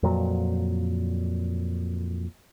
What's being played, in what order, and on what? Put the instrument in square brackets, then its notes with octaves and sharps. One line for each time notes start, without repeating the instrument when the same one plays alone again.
[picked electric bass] F2 A#2 F#3